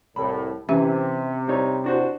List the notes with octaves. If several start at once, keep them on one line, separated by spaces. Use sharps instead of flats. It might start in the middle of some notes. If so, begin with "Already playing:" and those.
C2 A2 B5
C3 E3 C#4 G4 E5
G3 D#4 C#5
D4 F#4 C5